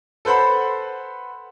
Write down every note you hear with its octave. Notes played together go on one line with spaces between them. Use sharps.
A4 B4 C5 F#5 B5